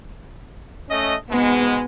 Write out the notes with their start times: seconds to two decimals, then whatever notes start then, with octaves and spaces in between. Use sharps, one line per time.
0.90 A3 C#4 D#5
1.30 G#2 B2 G#3 B3